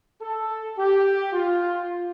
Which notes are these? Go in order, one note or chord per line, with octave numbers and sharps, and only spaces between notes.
A4
G4
F4